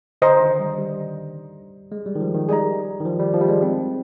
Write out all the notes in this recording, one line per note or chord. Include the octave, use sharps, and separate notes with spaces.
D3 C5 D#5 A#5
D#3
G3
G3
G#3
G3
D#3
F3
D#3
G3 G#4 D#5 A#5
D#3
F3
G3
F3
G3
G#3
C4